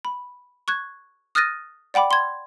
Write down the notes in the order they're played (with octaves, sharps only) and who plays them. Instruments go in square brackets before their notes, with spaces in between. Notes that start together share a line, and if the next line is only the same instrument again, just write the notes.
[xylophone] B5
C#6 F#6 G#6
D#6 F6 F#6 A6 A#6 D#7
D5 F#5 G5 B5 D6
C6 G#6